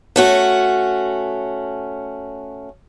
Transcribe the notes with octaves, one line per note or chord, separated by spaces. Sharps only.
A3 C#4 F#4